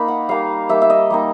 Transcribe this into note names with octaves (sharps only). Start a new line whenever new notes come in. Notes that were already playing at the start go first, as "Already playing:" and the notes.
Already playing: A#3 D#4 B5
F#5
G3 A#3 D#4 F5
G3 A#3 D#4 E5
E5
D#5
G3 A#3 D#4